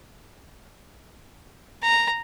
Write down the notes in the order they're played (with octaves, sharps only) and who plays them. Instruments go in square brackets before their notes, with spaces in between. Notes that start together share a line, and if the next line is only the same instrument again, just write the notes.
[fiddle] A#5